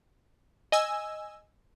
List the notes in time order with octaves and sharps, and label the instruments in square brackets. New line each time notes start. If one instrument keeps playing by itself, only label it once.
[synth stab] D#5 G#5 E6